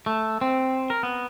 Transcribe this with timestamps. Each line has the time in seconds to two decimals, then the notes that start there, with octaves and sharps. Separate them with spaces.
0.06 A3
0.41 C4
0.90 A#4
1.03 B3